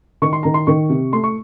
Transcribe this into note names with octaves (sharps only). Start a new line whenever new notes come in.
D#3 C#6
C6
D#3 A#5
C6
D#3 C#6
C3
A3 C6
C#6